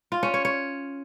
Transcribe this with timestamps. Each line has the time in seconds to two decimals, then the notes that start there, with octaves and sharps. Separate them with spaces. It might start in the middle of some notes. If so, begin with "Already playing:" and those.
0.12 F4
0.23 C#4
0.34 C#5
0.45 C#5